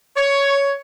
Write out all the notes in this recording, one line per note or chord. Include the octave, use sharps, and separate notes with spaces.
C#5